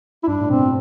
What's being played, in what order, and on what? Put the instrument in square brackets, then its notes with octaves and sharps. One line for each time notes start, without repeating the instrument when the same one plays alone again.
[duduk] E4
[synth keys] G2 [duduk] D4
[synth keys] A2
[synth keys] G2 B2 [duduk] C4